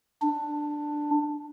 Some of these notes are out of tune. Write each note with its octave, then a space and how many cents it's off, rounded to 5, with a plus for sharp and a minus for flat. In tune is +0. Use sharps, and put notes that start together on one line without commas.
D4 +10